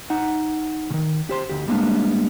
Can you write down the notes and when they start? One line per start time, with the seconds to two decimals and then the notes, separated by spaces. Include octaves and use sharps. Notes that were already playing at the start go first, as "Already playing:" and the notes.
0.10 D#4 F#5
0.90 C3 D#3
1.29 G4 C5 C6
1.50 D2 G4
1.68 G3 G#3 A#3 B3 D4